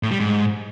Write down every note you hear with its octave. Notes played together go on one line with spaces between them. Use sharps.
A2
G3
G#2